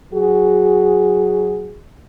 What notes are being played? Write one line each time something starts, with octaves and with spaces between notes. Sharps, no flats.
F#3 F#4 G#4